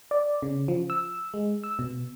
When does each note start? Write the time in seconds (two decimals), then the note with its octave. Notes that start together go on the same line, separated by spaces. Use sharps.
0.11 D5
0.43 C#3
0.68 F3
0.90 E6
1.34 G#3
1.64 E6
1.79 B2